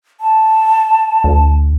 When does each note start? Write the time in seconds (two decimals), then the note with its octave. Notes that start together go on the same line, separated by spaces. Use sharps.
0.20 A5
1.24 D2